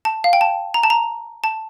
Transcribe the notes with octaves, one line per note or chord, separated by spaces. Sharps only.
A5
F5
G5
A5
A#5
A5
A#5
A5